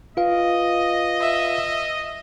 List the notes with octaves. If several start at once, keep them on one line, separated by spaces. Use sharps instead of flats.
F4 B4 D#5 F5
E5